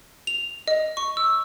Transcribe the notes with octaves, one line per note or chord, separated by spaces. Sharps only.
F7
D#5
C#6
E6